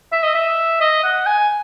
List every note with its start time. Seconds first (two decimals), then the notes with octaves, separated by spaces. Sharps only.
0.12 E5
0.23 D#5
0.35 E5
0.81 D#5
1.04 F#5
1.26 G#5